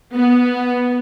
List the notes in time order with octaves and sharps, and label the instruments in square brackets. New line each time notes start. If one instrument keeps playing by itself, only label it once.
[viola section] B3